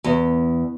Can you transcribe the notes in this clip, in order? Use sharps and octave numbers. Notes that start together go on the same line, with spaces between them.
E2